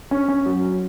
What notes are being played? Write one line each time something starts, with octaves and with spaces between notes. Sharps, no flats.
C#4
C#4
F#3